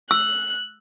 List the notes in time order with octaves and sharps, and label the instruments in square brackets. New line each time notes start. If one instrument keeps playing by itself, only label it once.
[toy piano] E6 [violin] F#6